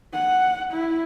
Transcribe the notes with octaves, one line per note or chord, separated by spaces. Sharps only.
F#5
E4